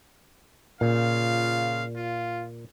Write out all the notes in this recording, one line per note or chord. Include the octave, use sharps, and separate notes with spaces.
A#2 C#3 F4 F5
F4